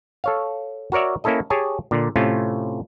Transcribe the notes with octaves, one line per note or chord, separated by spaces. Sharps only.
A4 C#5 F5
F#4 A#4 C#5 D5 E5
A#3 C#4 E4 A4 D#5
G4 G#4 C#5 G#5 A5
A#2 D3
A2 C3 A3 C#4 F4